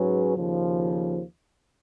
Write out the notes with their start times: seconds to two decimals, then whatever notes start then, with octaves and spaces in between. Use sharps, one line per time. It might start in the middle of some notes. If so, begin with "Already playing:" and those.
Already playing: G#2 F#3 C#4 G#4 B4
0.36 D#2 C#3 F3